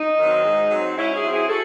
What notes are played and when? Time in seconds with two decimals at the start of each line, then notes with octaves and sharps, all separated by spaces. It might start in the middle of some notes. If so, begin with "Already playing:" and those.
Already playing: D#4
0.19 D#3 F#3 C4
0.45 G#2
0.71 F#3 C4
0.96 G#2 C#4 E4
1.14 E4 G#4
1.22 F#3 C4
1.32 E4 G#4
1.49 F#4 A4